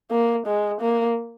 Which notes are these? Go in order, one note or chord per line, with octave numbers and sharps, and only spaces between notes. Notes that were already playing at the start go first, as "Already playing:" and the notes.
A#3
G#3
A#3